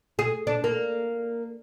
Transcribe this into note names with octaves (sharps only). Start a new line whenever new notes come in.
G#4
D4
A#3